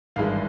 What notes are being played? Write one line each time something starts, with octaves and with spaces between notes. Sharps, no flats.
G#1 G2 E3 G#3 F5